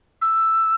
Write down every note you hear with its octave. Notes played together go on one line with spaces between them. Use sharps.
E6